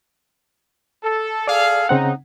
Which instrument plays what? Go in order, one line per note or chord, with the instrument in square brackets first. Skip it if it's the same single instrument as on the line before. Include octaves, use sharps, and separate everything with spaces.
[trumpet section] A4
[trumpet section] G#4 A4 F5 [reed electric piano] D5
[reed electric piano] C#3 C4 F#5 [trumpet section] D#4